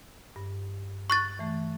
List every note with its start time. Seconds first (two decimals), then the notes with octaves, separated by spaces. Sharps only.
0.36 G2
1.10 C#6 F#6 A6
1.39 E3 A3